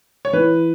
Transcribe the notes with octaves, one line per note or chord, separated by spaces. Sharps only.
C#5
E3 B4